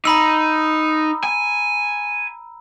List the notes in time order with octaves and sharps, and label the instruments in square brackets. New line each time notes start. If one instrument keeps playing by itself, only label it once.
[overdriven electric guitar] D#4 [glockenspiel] A#5 B5 E6
[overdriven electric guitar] G#5